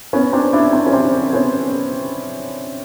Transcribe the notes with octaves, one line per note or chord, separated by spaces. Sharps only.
B3 C#4
C4 D4
D4 E4
C4 D4
C#4
C4 D4
B3 C#4